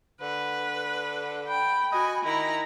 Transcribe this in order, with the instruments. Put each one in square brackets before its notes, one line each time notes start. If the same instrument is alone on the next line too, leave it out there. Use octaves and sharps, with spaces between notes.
[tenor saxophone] D3 [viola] B4
[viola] G5 [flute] B5
[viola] F#4 G#5 [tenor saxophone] D#5
[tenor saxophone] D#3 [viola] E4 A#5